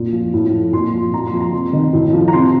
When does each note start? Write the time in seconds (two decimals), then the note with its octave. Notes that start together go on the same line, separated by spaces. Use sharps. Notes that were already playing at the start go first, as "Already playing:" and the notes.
Already playing: A#2
0.13 F3
0.34 A2
0.54 F3
0.73 A#2 C6
0.94 F3
1.13 A#2 A#5
1.27 C6
1.33 F3
1.40 A#5
1.53 C3
1.73 D#3
1.93 A2
2.13 F3
2.28 A#5
2.33 C3 C6